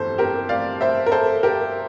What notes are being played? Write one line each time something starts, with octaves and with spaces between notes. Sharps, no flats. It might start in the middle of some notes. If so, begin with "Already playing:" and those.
Already playing: G1 F2 E3 A4 C5
G4 A#4
D5 F5
C5 E5
A#4
A4 C5
G4 A#4